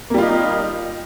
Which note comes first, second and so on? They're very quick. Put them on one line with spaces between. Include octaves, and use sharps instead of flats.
A#3 G3 F4 D#4